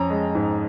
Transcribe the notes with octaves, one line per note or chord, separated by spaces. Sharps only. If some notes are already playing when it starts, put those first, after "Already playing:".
Already playing: F2 C#4 A#5
G#3
G#2